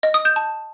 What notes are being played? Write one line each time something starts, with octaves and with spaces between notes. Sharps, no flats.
D#5
D#6
G6
A5